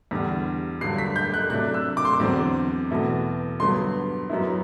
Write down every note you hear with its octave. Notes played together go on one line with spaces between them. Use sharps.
E2 D3 G3
G2 D3 F#3 C7
B6
G6
F#6
C3 F#3 A3 D4 F#6
E6
D6
C6
D6
E2 D3 F#3 C4
E2 B2 A3
G2 D3 F#3 B3 C6
F#2 F#3 B3 E4